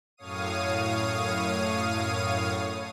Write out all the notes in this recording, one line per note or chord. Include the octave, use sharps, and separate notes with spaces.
F#2 A2 C#5 F5 D#6 D#7